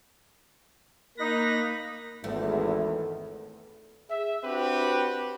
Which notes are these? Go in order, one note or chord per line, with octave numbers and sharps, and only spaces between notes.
A#3 D#4 B5 F#6 A#6
G#1 E2 A3
G#4 E5
C4 D4 F#4 G4 B4